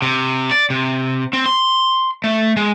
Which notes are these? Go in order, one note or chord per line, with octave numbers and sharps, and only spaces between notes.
C3
D5
C3
C4
C6
A3
G#3